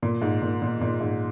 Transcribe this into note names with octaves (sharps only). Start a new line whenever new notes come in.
A#2
G#2
A#2
A#2
A#2
G#2